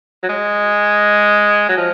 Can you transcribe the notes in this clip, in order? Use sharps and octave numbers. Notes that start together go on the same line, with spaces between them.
F#3
G#3
F#3
F3